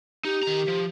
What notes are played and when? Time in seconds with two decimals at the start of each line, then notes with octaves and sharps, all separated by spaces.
0.25 D#4 G4
0.43 D#3 A#5
0.68 F3